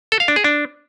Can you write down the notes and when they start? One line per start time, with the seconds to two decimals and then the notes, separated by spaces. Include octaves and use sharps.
0.12 A4
0.20 F5
0.28 D4
0.36 G#4
0.44 D4